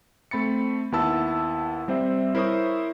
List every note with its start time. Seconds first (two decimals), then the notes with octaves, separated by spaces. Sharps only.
0.31 A3 C4 B5 A6 C#7
0.92 D#2 B3 E4 A5 E6
1.88 G3 C4 C5 E5
2.35 E4 A#4 C5 C#5 C#6 D#6